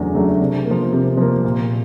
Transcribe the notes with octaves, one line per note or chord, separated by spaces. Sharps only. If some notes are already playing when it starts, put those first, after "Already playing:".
Already playing: E2 C#3 F#3 A3 D4
C#3 F#3 A3 D4
C3
A#3
F3
C3
F3 A#3
A#2